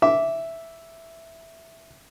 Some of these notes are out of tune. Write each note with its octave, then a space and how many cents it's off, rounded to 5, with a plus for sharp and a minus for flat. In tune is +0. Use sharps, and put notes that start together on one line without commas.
E5 +0 D6 -15